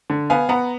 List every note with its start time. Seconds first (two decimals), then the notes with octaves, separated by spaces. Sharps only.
0.10 D3
0.30 B3 F5 G#5
0.49 B3 F#5 A#5